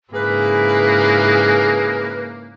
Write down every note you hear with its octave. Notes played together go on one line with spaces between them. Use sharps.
G#2 C#3 A#3 E4 G#4 B4